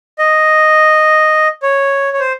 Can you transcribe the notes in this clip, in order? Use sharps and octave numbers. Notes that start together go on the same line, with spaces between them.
D#5
C#5
C#5
C5